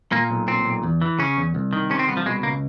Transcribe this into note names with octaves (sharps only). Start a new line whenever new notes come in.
A#2 A#3
B1
A#2 C4
B1
E2
E3
C#3 C#4
E2
C2
D#3
C3 C#4
C4
C2 B3
F3
B2 G#3
C#2 A#3